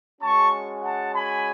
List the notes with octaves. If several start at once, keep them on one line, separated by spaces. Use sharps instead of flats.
G#3 C#4 F#4 A5 C#6
F#5 A5
G#5 B5